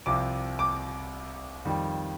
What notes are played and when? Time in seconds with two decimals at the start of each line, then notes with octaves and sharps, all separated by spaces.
0.06 C2 C3 F3 D6
0.59 D6
1.65 F2 D#3 G3